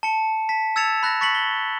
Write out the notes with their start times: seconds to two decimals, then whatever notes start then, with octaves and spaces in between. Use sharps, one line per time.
0.03 A5 C#7
0.49 A5 B6
0.76 E6 G#6 A6 C#7 E7 F7
1.03 B5 F#6 A6 A#6
1.21 C#6 A6 B6 C#7 F#7
1.35 G7